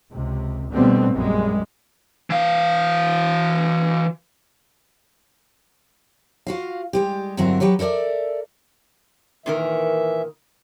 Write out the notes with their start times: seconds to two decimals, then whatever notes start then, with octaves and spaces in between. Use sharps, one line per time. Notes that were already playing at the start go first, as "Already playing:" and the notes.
0.11 C#2 C3
0.72 B2 D3 G3 A3 B3 C4
1.11 A#1 F#2 G3 G#3
2.30 E3 F5
6.47 F4 F#4 F5
6.93 G3 G#3 G4
7.37 G2 D3 F#3 C4 E4 A#4
7.60 F#3 G4 B4 C#5
7.79 A4 A#4 C5 D5 E5
9.46 A#2 D#3 E3 A#4 E5